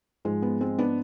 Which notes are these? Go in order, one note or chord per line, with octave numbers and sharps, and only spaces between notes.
G#2 F3 G#3
B3
G#3 C4
B3 D4